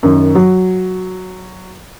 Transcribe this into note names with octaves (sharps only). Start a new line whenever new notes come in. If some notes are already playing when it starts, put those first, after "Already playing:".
F#2 D#3
F#3